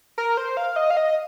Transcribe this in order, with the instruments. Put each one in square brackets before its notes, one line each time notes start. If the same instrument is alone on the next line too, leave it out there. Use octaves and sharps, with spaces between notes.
[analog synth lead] A#4
C5
F5
D#5
F5
D#5